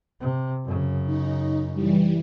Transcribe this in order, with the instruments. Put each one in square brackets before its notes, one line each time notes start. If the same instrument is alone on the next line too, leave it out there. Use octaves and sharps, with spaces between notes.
[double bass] C3
F#2 C#3
[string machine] D#4
E3 G3